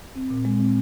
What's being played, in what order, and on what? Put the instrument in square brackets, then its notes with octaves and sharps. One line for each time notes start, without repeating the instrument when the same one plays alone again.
[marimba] C4
A#2
G#3
C4